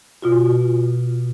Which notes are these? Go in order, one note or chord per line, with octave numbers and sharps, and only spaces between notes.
B2 F4 F#4